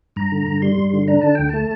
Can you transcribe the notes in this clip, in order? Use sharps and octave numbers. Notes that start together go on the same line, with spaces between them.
G2 A#5
D3
G2
G3 C6
G2
D3
D4 A#5
D3 A5
D2 G5
A3 A5